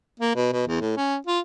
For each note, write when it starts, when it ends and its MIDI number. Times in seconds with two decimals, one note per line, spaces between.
0.20 0.34 58
0.36 0.50 47
0.53 0.66 47
0.67 0.79 40
0.81 0.93 45
0.97 1.17 61
1.27 1.40 65